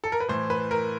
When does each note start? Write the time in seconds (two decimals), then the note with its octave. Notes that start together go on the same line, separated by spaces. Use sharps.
0.04 A4
0.12 A#4
0.20 B4
0.29 A2 E3 C5
0.50 B4
0.71 A#4